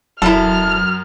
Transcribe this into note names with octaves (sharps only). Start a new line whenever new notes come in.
E1 F#2 E4 A4 F6